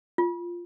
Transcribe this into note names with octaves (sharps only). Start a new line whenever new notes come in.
F4